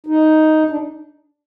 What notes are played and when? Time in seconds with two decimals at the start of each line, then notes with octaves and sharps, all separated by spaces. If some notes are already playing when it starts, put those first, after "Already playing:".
0.07 D#4
0.70 D4